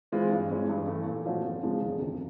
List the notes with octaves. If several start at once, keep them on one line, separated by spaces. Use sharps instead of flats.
E3 G#3 C4 F4
G2
E3 G#3 C#4
G2
E3 A3
A#2
F3 A3 C#4 F#4
G#1
F#2 C#3 F3 G#3
E1
D2 C3 D#3